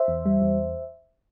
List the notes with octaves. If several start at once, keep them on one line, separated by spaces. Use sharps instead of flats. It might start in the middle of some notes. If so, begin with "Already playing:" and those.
Already playing: C5 E5
E2
G3
E2